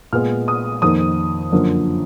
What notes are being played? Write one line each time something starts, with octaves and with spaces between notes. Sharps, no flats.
A#2 G#3 B3 F6
D#6
F2 D#3 A#3 D#6
F#2 D3 F3 A#3